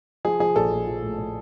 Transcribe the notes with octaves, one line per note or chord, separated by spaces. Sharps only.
F3 G#4
F3 G#4
A#1 A4
A#1
F3
A2
A2